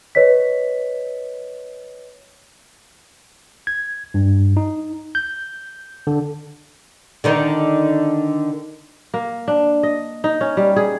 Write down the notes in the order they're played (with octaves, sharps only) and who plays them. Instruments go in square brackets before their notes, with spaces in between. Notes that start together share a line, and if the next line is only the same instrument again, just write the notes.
[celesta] B4 C#5 D#5 B6
[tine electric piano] G#6
G2
D#4
G6
D3
[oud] D3 D#3 D#4
[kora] A#3
D4
D#5
D#4
C#4
G3
G#4